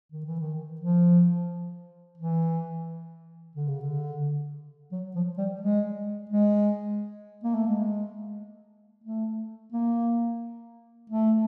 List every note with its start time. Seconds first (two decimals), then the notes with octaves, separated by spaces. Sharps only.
0.12 D#3
0.25 E3
0.40 D#3
0.81 F3
2.18 E3
3.55 D3
3.68 C#3
3.80 D3
4.92 F#3
5.16 F3
5.38 G3
5.61 G#3
6.30 G#3
7.43 A#3
7.55 A3
7.67 G#3
9.04 A3
9.72 A#3
11.10 A3